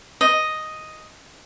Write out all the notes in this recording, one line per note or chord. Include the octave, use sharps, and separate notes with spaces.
D#5